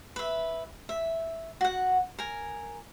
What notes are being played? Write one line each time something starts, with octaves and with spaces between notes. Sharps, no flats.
B4 E5
E5
F#4 F#5
A#4 G#5